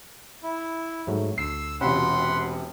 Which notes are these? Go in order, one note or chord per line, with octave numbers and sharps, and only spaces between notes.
E4
G#2 F#3 A3
D2 E6 C7
E1 C3 C#4 F4 F#4 F#5 B5 C6